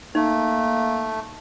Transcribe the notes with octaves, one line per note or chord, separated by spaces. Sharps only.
A3 A#3 D#4